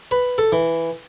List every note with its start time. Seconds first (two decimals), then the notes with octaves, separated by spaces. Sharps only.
0.11 B4
0.38 A4
0.52 E3